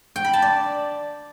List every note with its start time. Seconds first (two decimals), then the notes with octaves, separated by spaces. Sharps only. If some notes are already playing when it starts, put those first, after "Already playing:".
0.16 G5
0.25 B5
0.33 A5
0.42 D5